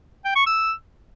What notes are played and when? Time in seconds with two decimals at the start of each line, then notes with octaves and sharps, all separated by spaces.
0.24 G5
0.35 C#6
0.47 E6